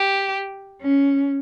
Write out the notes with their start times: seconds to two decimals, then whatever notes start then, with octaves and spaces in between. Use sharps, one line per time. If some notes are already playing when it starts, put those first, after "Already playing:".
Already playing: G4
0.82 C#4